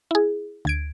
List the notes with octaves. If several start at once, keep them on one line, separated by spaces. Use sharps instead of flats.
E4 G#4
D2 G#6 D7